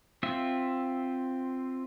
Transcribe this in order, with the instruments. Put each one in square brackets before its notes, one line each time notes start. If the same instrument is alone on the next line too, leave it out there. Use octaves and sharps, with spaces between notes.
[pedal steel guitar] C4 F4 E5